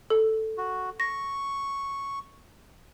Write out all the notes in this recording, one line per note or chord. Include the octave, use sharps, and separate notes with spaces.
A4
F#4
C#6 A#6